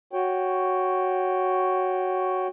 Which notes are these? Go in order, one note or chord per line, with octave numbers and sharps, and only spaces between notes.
F#4 C#5 G5